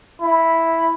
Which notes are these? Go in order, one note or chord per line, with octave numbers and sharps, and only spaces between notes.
E4